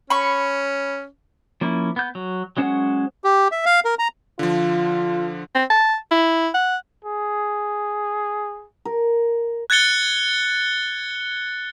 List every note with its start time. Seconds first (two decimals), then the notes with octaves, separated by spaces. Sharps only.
0.10 C#4 B5 C#6
1.61 F3 A#3 C#4 E4
1.96 B3 G6
2.15 F#3
2.57 F#3 G#3 C#4 C5 F#5
3.24 G4
3.52 E5
3.66 F5
3.85 A#4
3.99 A#5
4.39 D3 F3 F4
5.55 C4
5.70 A5
6.11 E4
6.54 F#5
7.05 G#4
8.85 A#4
9.70 F#6 G#6 A6 C#7 G7